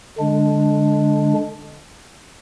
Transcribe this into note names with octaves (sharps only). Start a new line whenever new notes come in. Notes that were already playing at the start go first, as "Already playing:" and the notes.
D3 G#3 D4